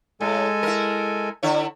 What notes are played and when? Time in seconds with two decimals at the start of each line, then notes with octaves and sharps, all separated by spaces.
0.21 A2 G#3 A4 G#5
0.63 E4 A#4
1.43 D3 E4 C#5